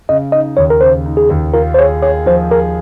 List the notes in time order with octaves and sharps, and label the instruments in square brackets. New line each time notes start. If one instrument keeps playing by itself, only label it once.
[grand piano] C#3 [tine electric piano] D#5
[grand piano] D#4 [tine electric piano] D#5
[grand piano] D#2 [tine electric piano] C#5
[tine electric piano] A#4
[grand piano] C#3 [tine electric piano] C5
[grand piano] D#4
[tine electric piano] G#4
[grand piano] D#2
[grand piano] F4 [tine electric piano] A#4
[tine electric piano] C5
[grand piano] G#4 [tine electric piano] C#5
[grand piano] G#4 [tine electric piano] C#5
[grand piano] F3 [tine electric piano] C5
[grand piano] G#4 [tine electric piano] A#4